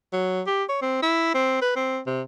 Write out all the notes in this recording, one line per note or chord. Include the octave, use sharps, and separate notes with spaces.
F#3
G4
C#5
C4
E4
C4
B4
C4
C3